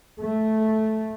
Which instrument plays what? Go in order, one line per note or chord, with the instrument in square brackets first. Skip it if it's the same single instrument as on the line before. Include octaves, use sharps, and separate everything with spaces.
[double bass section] A3